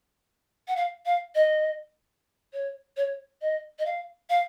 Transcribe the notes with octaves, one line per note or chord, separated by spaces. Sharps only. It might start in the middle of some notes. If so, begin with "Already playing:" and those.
F#5
F5
F5
D#5
C#5
C#5
D#5
D#5
F5
F5